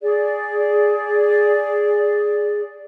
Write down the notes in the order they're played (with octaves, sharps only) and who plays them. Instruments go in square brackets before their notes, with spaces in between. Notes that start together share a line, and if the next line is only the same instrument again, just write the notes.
[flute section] G#4 D5